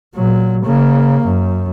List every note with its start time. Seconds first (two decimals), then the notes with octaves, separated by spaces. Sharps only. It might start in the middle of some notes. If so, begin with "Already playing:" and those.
0.15 A#2 F#3
0.64 C#3 A#3
1.24 F#2